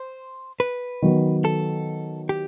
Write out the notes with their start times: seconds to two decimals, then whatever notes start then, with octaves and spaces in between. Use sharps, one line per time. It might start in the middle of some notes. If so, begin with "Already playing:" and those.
Already playing: C5
0.60 B4
1.02 D#3 F#3 B3
1.45 A4
2.29 G4